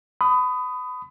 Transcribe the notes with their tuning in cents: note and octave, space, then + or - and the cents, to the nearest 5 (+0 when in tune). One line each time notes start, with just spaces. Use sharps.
B5 +30 D#6 +0